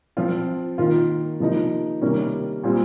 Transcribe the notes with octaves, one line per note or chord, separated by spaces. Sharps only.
F3 C4 F4
D#3 A#3 F4
C3 F3 A#3 D#4
C3 D#3 G3 A#3 C#4
A#2 G3 C4 F4